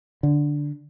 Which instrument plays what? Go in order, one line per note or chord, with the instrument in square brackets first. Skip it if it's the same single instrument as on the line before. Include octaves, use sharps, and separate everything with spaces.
[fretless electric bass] D3